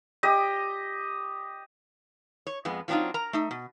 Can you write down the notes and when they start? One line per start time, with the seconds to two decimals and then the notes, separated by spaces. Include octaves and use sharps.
0.23 G4 D#5
2.47 C#5
2.65 F2 G#3 B3
2.88 F3 F#3 C4 D4 D#4 F4
3.14 A#4 A#5
3.33 A3 D#4 E5
3.51 B2